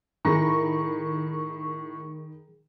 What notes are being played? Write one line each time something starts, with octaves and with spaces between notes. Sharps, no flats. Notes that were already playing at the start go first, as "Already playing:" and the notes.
A2 D#3 G#4 A#5 B5 C#6 A#6